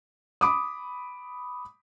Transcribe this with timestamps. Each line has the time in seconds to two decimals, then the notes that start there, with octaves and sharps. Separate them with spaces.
0.41 B5 D6 D#6